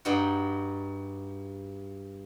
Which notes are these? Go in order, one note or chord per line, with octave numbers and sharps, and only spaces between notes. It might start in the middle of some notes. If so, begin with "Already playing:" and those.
G2 G3 D#4 F#4